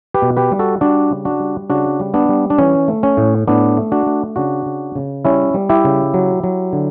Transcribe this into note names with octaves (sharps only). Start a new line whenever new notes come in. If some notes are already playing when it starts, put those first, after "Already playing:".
G4 B4
B2
G4 B4
G3
F#4 A4
G3 D4 F#4
C#3
D4 F#4
G3
C#3 D4 F#4
G3
B3 D4
G3
D4
E3 C#4
A3
C#4
A2
A2 B3 D4
A3
D4 F#4
A3
C#3 D4 F#4
C#3
C#3
G3 C#4 E4
G3
E4 G4
C#3
F#3
F#3
D3